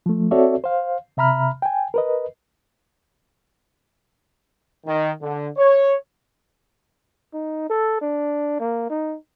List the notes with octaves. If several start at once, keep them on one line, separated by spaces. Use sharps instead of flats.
F3 A3
C4 F#4 A4 C#5 D5 E5
C5 F5
C3 E5 A#5 B5 F6
G5 G#5
A#4 B4 D#5
D#3
D3
C#5
D#4
A4
D4
A#3
D#4